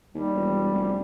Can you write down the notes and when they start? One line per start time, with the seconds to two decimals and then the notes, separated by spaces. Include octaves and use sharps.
0.15 D#2 G3
0.35 E1
0.73 F1